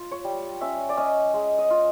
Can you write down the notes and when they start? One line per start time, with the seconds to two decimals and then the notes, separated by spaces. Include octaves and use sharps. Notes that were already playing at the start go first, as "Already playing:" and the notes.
Already playing: F4
0.11 C#5
0.24 G3
0.61 C#4 E5
0.89 D5
0.97 C#4 D#5
1.34 G#3
1.58 D#5
1.70 F4